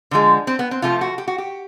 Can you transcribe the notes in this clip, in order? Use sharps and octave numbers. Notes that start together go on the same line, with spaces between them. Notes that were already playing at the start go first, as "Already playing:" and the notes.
D3 F3 G#3
C4
B3
C4
C3 F3 A3 F4
F#4
G4
F#4
G4